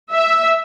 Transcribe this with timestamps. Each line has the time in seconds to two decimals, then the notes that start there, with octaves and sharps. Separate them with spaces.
0.11 E5